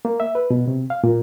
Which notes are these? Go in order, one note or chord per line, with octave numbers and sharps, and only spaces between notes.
A#3
E5
B4
B2
C3
F5
A#2